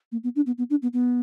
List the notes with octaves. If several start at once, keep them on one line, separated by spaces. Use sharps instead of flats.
A#3
B3
D4
B3
B3
D4
B3
B3